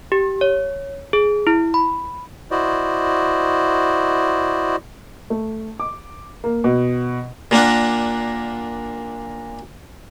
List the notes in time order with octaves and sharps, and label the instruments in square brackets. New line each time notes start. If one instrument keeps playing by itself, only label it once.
[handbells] G4
C#5
G#4
E4
B5
[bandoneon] E4 F#4 C5 D5 D#5
[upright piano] A3
D6
A#3
B2
[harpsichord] A#2 A#3 D4 F#5